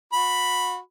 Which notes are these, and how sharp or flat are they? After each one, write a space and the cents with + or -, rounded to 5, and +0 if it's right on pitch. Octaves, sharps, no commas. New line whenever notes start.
F#4 -35 B5 +0